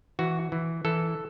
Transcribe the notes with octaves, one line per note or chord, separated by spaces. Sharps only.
E3 F#4
E3
E3 A4